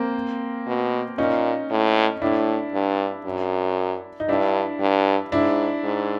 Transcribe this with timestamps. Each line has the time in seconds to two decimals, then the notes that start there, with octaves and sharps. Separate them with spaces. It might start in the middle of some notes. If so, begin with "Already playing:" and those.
Already playing: A#3 C4
0.67 B2
1.18 A#2 C#4 D#4
1.71 A2
2.22 A2 D4 E4
2.74 G2
3.25 F#2
4.20 D#4
4.29 G2 D4 E4
4.80 G2
5.32 G#2 D4 E4
5.84 G#2